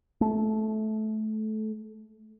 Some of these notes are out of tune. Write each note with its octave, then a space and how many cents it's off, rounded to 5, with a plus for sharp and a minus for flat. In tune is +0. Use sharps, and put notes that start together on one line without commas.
A3 -20